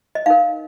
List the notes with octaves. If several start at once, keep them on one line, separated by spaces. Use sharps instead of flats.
D#5
D#4 A#4 F5